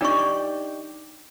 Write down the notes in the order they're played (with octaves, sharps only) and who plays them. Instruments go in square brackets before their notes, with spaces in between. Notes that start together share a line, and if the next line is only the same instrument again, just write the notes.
[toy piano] D4 C#6 [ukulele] D#4 G4 D5